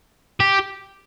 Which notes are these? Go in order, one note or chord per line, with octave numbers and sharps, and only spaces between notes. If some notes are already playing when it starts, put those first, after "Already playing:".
G4